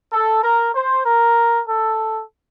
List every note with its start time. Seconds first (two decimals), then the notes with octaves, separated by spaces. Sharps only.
0.13 A4
0.43 A#4
0.74 C5
1.06 A#4
1.67 A4